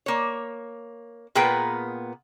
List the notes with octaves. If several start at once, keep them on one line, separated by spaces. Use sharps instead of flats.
A#3 C#5
A#2 A#3 B3 G#4 B4 G5